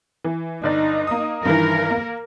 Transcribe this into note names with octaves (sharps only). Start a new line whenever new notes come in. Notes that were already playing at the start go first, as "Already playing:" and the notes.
E3
G1 D#4 D5
A#3 D#6
G2 D#3 E3 A#4
A#3